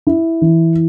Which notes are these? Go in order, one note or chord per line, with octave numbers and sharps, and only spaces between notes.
E4
E3